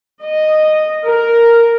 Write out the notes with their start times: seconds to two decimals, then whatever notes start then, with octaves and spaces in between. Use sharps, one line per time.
0.22 D#5
1.05 A#4